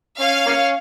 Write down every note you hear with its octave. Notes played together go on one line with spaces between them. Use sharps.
C#4 F5
A#3 C#4